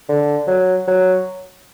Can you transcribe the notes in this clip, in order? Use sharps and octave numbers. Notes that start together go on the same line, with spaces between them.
D3
F#3
F#3